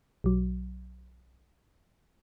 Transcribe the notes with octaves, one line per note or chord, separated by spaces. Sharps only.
B1 F#3